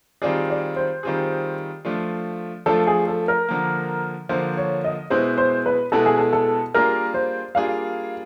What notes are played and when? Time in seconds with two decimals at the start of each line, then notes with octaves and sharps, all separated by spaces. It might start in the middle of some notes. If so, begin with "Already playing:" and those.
0.22 D#3 G3 C4 F4 G#4 D5
0.50 D5
0.76 C5
1.03 D#3 G3 C4 F4 G#4
1.85 F3 A3 D4 F4
2.66 F3 A3 D4 F4 A4
2.87 G#4
3.08 A4
3.28 A#4
3.49 D3 F3 A#3
4.29 D3 F3 A#3 C5
4.57 C#5
4.84 D#5
5.10 B2 G#3 B3 E4 C5
5.38 C5
5.66 B4
5.92 B2 G#3 B3 E4 A4
6.06 G#4
6.18 A4
6.33 A4
6.74 G3 A#3 D4 F4 G#4 A#4
7.14 C5
7.55 G3 A#3 D4 F4 G#4 F5